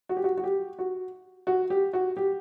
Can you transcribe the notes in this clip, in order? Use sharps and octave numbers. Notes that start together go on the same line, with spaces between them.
F#4
G4
F#4
F#4
G4
F#4
F#4
G4
F#4
G4